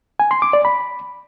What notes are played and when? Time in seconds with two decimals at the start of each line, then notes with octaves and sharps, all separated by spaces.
0.20 G#5
0.31 C6
0.42 D6
0.53 D5
0.65 B5